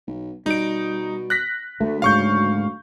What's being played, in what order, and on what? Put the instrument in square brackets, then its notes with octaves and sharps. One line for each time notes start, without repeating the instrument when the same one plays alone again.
[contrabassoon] B1
[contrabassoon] B2 [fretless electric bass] G3 [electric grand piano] D#4 D7
[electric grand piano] F#6 A#6 B6
[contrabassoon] D2 [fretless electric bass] A3
[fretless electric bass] G#2 C#3 F#3 [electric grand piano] F5 C#6 G6